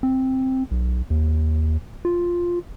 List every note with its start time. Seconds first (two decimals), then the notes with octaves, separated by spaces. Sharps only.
0.03 C4
0.71 B1
1.10 D#2
2.05 F4